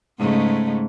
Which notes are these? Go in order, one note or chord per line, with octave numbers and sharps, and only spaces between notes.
G#2 C#3 A3